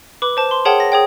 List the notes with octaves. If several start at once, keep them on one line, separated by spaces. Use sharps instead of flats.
B4 B5 D6
C5 A5 D6
C6
G#4 A#4 C#5 F#5 G5 A5
A#6
G#4 C#5 G5